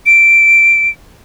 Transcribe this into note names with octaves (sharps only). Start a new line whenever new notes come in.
D7